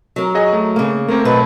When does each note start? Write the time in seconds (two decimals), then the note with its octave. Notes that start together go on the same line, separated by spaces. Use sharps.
0.16 F#3 A#4
0.35 F#4 G#4 D#5
0.53 A3
0.76 C#3 A#3
1.08 A3 A#3 C4 A#4
1.25 B2 F#3 B4